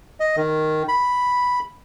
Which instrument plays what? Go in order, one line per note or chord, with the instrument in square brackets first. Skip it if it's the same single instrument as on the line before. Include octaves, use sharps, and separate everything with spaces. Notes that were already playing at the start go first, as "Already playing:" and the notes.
[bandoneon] D#5
D#3
B5